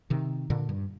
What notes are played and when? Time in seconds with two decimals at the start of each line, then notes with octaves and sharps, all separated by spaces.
0.10 C3 D#3
0.50 A#2 D3
0.69 G2